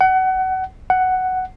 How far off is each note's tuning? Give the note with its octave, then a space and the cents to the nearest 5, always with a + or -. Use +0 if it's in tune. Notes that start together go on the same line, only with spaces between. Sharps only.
F#5 +25
F#5 +5